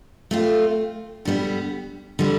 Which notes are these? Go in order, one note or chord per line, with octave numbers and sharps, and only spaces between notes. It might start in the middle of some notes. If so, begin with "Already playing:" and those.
A3 C4 F4
D3 G3 B3
D3 G3 B3